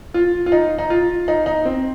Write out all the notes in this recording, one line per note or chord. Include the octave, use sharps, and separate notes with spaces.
F4
F4
D#4
D#4
F4
D#4
D#4
C4